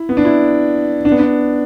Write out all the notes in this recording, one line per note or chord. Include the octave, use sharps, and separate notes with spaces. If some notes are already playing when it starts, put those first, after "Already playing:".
Already playing: E4
B3
D4
E4
D4
B3
D4